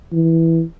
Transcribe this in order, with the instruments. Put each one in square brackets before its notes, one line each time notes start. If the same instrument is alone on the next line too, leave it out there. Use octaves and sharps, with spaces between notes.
[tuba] E3